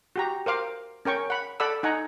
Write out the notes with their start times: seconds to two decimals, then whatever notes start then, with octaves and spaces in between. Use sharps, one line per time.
0.16 F#4 G4 A#5
0.46 A#4 C5 F5 D6
1.05 C#4 A#4 G5 C#6
1.30 F#5 B5
1.60 A4 D5 F#5 B5 E6
1.83 D#4 F#5 G#5 A#5